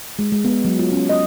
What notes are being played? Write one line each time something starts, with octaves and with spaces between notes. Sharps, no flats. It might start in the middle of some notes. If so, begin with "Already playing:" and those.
G#3
G#3
B3
F#3
F4
C#4
D#5